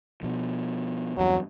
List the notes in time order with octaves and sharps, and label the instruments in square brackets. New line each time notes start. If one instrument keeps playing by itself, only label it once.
[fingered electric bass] B2 F3
[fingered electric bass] E2 G2 [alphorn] F#3